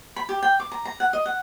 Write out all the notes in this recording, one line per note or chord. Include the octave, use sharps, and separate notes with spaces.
B5
G4
G5
D6
A#5
A#5
F#5
D#5
F#5